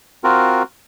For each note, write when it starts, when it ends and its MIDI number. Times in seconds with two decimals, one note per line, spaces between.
0.24 0.63 60
0.24 0.63 65
0.24 0.63 66
0.24 0.63 70